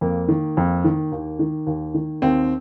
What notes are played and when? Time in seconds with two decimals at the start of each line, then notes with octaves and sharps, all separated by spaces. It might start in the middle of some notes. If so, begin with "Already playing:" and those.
0.01 F2 A#3
0.28 D#3
0.57 F2
0.84 D#3
1.12 D#2
1.39 D#3
1.67 D#2
1.94 D#3
2.22 D#2 C4